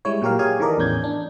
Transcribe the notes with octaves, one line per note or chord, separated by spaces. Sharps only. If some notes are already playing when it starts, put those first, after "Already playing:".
G3 G#3 E4 C#5
A#2 F#3 G4 A#4 F5
G4 G#4 C#5 F5 G#5
D#3 E3 A4 A#4 D5 D#5
E2 A2 C#4 G6 G#6
D4